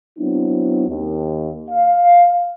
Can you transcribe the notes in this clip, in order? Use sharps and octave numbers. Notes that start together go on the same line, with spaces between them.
F#3 B3 C4 D4 E4
D#2
F5